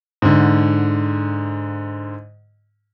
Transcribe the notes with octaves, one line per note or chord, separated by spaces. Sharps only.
G#2 D3